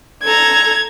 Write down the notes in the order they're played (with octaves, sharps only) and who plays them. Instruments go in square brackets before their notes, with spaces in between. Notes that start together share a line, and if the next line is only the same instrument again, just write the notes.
[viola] A4 A#5 [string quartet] G#6